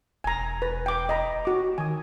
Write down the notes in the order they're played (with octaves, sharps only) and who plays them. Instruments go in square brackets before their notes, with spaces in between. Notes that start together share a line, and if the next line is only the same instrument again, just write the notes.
[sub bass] E1 [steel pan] G#5 A#5
[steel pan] B4
G5 D6
D#5 A#5 B5
F#4 D6
[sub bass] D#3 [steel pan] G#5 D#6